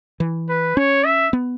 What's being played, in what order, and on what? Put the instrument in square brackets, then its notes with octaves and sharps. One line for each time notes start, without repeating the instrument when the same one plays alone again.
[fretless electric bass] E3
[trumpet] B4
[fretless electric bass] C#4 [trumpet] C#5
[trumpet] E5
[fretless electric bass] B3